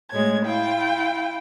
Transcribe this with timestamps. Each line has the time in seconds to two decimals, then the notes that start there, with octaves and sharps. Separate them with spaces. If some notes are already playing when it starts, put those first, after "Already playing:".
0.11 A2 G#3 C#5 G#6
0.44 E4 F4 G5